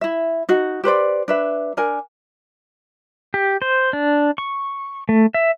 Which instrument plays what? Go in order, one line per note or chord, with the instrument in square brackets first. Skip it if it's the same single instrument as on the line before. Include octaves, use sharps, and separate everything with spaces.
[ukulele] E4 E5
D#4 F#4
G4 B4 C5 D5
D4 B4 E5
D4 A#4 G#5
[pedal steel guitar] G4
C5
D4
C#6
A3
E5